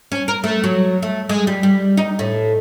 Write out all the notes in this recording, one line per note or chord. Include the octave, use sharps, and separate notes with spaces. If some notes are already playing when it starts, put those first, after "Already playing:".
C#4
A#4
A3
F#3
A3
G#3
G3
G3
D#4
A2